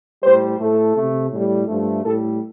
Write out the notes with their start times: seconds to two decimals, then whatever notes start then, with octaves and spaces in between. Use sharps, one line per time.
0.23 A2 G3 C5
0.59 A2 A3 A4
0.95 C3 A3
1.30 A2
1.36 G3
1.67 G2 F3 A3
2.02 A2 G3 A4